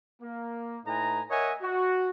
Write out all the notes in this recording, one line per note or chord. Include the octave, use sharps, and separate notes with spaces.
A#3
A2 D#4 B4 G#5 A#5
A#4 C#5 D#5 E5 F#5 G#5
F#4